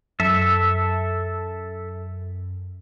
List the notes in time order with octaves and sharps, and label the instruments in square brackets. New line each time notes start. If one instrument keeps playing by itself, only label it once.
[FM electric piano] F#2 [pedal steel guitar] A4 E5